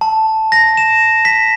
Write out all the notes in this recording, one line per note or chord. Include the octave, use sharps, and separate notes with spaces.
A5
A#6
E7
B6